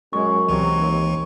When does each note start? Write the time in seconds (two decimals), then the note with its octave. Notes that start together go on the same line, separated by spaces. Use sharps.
0.13 F#2 G#3 C#6
0.49 C#2 C3 E3 F#3
0.77 D#2